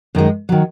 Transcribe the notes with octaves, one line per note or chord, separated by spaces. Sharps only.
F#2 D#3 G#3
D#3 F#3